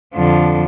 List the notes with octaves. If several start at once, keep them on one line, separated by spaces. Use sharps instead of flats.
F2 D3 F3